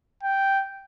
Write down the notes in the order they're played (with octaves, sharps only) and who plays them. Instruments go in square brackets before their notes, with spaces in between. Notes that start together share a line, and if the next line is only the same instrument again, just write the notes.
[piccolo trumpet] G5